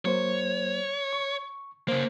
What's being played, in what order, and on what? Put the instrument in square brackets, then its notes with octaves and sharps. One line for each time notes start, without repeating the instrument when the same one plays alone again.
[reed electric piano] F#3 A#3 C5 [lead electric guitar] C#5
[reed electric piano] C#6
[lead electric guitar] C#3 A#3 [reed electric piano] C5